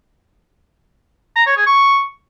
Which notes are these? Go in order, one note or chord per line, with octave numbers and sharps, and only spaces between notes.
A#5
C#5
G#4
C#6